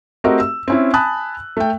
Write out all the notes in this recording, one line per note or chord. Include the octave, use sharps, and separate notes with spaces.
A3 C4 F#4 G4 A#4 D#5
E6
C4 C#4 E4
G#5 A5 B5 D#6 F#6
A3 G5